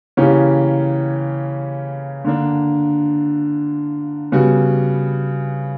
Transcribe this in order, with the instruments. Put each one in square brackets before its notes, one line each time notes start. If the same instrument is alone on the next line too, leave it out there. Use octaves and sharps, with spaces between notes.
[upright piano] C#3 E3 A#3 C#4 G4
D3 A#3 D4
C#3 G3 B3 F#4